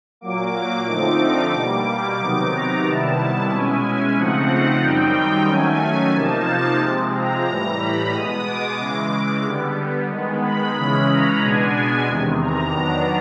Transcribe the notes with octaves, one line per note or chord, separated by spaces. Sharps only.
A#2 F#3 A#3 D6
D3 F3 A3 C4 D#4 D6
B2 G3 A#3
D6
C3 D#3 F#3 B3 D#4
A#5
C3 D#3 G3 B3 E4 A5
B2 G#3 C#4 E4 G#5
C#3 F3 A3 C4 D#4 F#5
F#2 D#3 G3 C4 D#4 G5
D#3 F#3 A3 C#4 G#5
C3 F3 A#3 D#4 A5
C3 F3 G#3 C4
A#5
A2 E3 G3
B5
B2 G#3 B3 D#6
D6
C#3 E3 G#3
D3 G3 B3
D#3 G#3 B3
B5
C#3 E3 G#3 C#4
A#5
B2 G#3 B3 D4 G#5
G#5
E2 C3 D#3
A#5
D#3 F#3 B3 D4